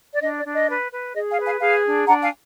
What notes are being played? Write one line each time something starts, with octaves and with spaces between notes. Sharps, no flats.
D5
D4 D#5
D5
D4
D#5
B4
B4
G#4 D#5
F5 G#5
B4
F5 G#5
G#4 F5 G#5
D4
D4 F#5 A#5
F5 G#5